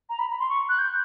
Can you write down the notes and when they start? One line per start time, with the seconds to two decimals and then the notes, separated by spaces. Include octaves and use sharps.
0.09 A#5
0.19 B5
0.29 B5
0.39 C6
0.49 C#6
0.69 F#6
0.78 G6